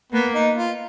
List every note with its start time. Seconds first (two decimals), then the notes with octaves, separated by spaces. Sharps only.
0.12 A#3 B3
0.35 D#4
0.56 F4